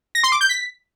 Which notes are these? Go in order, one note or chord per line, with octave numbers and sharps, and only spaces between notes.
A#6
C6
D6
G6
B6